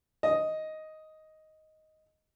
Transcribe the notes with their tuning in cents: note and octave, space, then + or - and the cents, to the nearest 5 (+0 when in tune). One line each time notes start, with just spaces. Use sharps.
D#5 +5